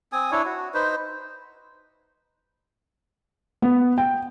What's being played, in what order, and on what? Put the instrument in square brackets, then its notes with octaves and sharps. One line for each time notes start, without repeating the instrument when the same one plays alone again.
[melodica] C4 G#5 D#6
D4 E4 C#5
F#4
D#4 B4 C5
[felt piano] B3
G5